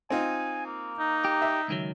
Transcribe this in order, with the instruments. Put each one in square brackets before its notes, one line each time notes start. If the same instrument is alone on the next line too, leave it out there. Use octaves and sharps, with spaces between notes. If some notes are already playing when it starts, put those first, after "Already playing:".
[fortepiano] C4 D#4 F4 [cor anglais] G#5
[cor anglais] A#3
[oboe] D#4
[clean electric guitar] G4
[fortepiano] E5
[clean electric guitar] C#2 D#3 F#3